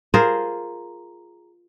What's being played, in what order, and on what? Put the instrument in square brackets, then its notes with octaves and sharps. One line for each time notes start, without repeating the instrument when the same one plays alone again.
[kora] F4 G#4 A#4 C5